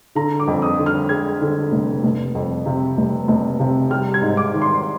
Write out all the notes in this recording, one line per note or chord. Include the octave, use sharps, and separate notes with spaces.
D3 A#5
D6
F2
D#6
D3
F6
G#3 G#6
D3
F1
F1
F2
C3
F1
F1
C3
G3 F6
G#6
G#2
D6
D#3
C6